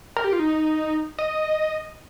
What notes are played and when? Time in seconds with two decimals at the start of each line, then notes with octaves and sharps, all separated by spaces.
0.17 A#4
0.24 G4
0.33 F4
0.39 D#4
1.19 D#5